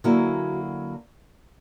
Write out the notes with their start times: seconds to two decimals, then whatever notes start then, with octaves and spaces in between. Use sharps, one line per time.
0.04 D3 F#3 A#3 C#4 E4 F#4 G#4